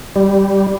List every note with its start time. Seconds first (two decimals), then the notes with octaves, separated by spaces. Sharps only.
0.16 G3